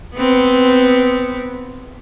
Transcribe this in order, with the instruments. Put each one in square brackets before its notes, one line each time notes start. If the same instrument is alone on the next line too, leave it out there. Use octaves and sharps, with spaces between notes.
[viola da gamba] B3 C4